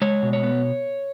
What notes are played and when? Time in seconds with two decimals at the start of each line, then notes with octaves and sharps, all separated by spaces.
0.02 G#3 C#5
0.22 B2
0.33 C#5
0.43 B3